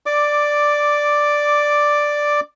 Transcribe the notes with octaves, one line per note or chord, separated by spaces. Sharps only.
D5 D6